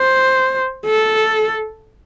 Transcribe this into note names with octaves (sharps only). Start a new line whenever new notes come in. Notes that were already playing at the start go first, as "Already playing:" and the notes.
Already playing: C5
A4